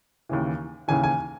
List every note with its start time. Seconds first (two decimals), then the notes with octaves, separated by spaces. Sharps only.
0.29 D#2 C#3 E3
0.88 D#2 C#3 E3 G#5
1.04 G#5